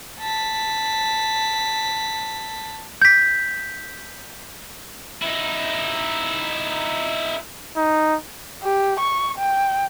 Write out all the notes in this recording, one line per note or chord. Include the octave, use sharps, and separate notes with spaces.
A5 B6
G6 B6
D#4 E4
D#4
G4
C#6
G5